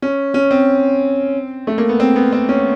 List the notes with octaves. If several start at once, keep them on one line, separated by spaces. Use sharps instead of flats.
C#4
C#4
C4
A3
A#3
B3
C4
B3
C4
C#4